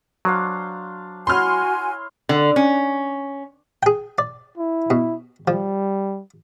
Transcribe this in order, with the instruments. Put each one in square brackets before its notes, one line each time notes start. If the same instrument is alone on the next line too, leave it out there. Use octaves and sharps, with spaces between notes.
[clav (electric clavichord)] F#3 [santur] D4 C5 F5
[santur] E4 C#5 [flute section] F#4 G#5 [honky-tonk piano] C6 F6
[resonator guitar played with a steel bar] D3
C#4
[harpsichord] G#4 G5
D5
[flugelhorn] E4
[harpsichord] B2
[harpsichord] F3 [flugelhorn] G3